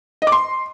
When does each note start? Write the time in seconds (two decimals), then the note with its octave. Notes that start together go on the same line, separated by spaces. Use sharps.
0.22 D#5
0.27 D6
0.32 C6